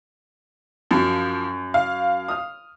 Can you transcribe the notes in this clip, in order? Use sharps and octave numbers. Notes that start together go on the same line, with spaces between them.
F#2 F3
F5
D#6 F6